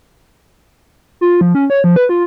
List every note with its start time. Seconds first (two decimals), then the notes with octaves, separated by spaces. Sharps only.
1.21 F4
1.41 F3
1.55 C#4
1.70 C#5
1.84 F3
1.96 B4
2.09 F4